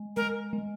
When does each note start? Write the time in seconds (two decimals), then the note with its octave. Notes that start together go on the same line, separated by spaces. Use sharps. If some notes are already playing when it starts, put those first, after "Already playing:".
Already playing: G#3
0.16 G#3 A#4
0.53 G#3